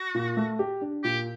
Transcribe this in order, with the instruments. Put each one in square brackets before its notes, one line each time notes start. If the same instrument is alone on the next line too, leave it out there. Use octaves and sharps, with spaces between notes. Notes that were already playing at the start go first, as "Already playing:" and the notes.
Already playing: [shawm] F#4
[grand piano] A#2
A3
G4
D4
[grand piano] A#2 [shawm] G4